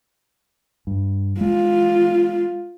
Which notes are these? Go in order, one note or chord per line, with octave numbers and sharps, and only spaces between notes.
G2
G#3 F4